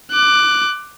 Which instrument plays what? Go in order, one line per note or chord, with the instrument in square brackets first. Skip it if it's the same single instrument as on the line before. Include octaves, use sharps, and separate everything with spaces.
[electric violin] D6 F#6